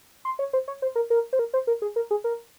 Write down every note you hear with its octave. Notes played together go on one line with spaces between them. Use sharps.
C6
C#5
C5
C#5
C5
A#4
A#4
C5
A#4
C5
A#4
G#4
A#4
G#4
A#4